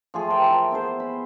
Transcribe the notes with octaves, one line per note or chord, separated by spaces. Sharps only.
F3 A3 F4 G#4
A#4 G5 A5
E4
B3 E4 G#4 C5
B5